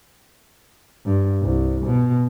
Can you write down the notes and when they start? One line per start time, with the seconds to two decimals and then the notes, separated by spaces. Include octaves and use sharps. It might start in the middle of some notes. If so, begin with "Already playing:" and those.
1.05 G2
1.42 C2
1.86 B2